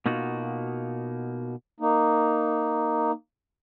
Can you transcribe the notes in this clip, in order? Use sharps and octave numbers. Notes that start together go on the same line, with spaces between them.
B2 A#3 D#4 F4 F#4
A#3 D#4